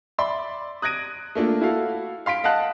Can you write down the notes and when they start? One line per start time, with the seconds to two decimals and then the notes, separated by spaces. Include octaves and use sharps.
0.18 D5 E5 B5 C6
0.82 D#6 F#6 G#6 A#6 D7 D#7
1.35 A3 A#3 D4 F4
1.61 E4 F#4 A4 F5
2.26 F5 C6 B6 D7
2.44 D#5 F5 F#5 A5 F#6